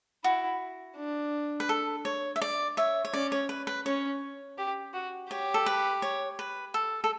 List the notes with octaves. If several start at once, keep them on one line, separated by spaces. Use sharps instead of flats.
E4 F#4
D4
B4
A4
C#5
E5
D5
C#5 E5
C#5
C#4 D5
C#5
B4
B4
C#4 C#5
G4
F#4
G4 C#5
A4
B4
C#5
B4
A4
A4